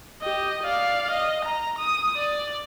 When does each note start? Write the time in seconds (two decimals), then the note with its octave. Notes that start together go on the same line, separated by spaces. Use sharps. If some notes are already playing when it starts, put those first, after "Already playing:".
0.22 G4 D#5
0.63 D5 F5
1.11 D#5
1.44 A#5
1.78 D#6
2.17 D5